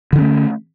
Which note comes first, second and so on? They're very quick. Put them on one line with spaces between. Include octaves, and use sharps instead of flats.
D3 D#3 C#4 A3